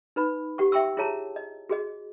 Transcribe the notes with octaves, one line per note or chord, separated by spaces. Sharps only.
D#4 B4 B5
G4 F#5 C#6
E5 G5 C6 C#6 E6
E4 F4 G#4 C#5 A5 A#5
D#5
F#4 G#4 D#5